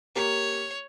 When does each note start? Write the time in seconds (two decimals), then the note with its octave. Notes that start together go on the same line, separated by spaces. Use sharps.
0.16 A#3 G4 C#5